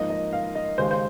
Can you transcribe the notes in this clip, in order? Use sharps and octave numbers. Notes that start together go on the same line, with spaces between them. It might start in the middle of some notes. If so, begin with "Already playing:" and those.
Already playing: G#2 F3 A#3 D#5
D#5
F5
D#5
D#2 C#3 G#3 C#4 C5
C5